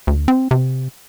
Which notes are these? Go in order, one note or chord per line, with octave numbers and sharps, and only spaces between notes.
D2
C4
C3